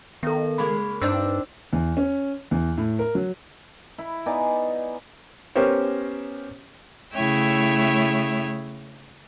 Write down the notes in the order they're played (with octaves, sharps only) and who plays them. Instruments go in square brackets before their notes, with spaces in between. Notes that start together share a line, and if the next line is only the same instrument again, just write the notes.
[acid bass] D#3 [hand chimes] B3 A4
[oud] C#3 G#3 A#3 [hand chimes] B5
[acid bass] G2 [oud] C4 D4 D#4 [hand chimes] E6
[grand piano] E2
C#4
E2
A2
A#4
F#3
[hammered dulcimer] E4
B3 D#4 D5 G#5
[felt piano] B3 C#4 G4 A#4 C5 C#5
[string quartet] C#3 A3 E4 C#5 E5 G5